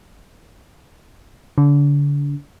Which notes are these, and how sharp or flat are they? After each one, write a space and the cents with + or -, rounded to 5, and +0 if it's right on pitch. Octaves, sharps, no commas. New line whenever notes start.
D3 -35